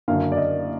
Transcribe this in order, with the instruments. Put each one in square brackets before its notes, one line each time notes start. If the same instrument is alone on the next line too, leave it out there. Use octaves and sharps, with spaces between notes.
[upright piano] F#1 F#2 D3 F5
D5
D#5